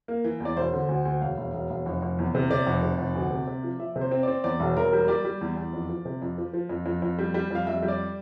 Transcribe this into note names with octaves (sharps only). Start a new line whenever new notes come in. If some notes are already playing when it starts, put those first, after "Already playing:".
A#3
E3
E2
D5
E1 C5
D3
D2
D2
E1 F5
E1
E1
E1
F1
F1
E2
C3
C3 D5
F1
C3
F1
D2
C3
C3
F3
F3 E5
C3
C5
C4
C4 D5
E2 D5
E1
E1 A#4
G3
G3 D5
G3
E2
E2
F2
F3
C3
F2
F3
F3
F2
F2
F2
G3
G3
F2 F5
F2 E5
G3
D5